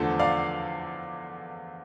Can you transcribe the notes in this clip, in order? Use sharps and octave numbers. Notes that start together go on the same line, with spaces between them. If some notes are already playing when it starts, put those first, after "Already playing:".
Already playing: E2 D3 F3 A3 A4 C5
D5 F5